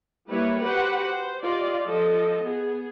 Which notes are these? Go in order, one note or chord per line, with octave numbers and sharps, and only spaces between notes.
G3 A#3 E4 B4 C#5
F#4 G4 B4 C5 F#5
C5
F4 G4 D5 D#5
F3 A4 D#5
B3 G#4